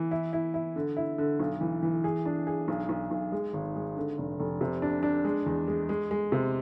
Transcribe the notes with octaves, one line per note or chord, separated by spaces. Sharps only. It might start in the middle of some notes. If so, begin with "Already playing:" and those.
Already playing: E3
E4
E4
E4
D3
E4
D3
B1
E3
E3
G#4
D4
G#4
B1
B1
B1
G#3
G#1
G#3
D3
F1
F1
C3
D4
D4
G#3
E2
G#3
G#3
G#3
C3